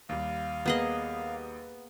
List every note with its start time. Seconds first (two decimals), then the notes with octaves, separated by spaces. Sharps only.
0.09 D#2 G3 F5
0.66 A#3 B3 G#4 D#5